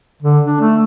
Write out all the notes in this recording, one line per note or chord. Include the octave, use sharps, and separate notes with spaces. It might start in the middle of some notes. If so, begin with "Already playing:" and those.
D3
D4
A3